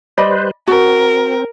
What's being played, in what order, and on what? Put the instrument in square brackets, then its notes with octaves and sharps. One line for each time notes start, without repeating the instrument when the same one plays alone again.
[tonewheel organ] G3 B4 C5 [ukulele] D5 D#5 B5
[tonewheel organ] C4 [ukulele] F#4 [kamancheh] A#4